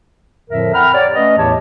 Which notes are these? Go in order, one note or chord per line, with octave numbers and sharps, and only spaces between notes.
F2 A2 D3 F3 A#4 E5
F#5 G5 A#5 B5 F6
G4 C#5 D5
A3 C#4 B4 D#5
E2 A2 E3 G4 C#5 A5